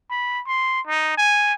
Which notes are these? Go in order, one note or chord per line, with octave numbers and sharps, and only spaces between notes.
B5
C6
D#4
G#5